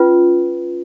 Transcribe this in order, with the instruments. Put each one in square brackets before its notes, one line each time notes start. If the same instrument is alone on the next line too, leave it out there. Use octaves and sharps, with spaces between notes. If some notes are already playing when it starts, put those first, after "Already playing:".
Already playing: [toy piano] C#4 F4 B4